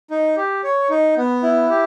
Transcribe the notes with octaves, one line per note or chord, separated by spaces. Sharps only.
D#4
G4
C#5
D#4
B3
E4
G4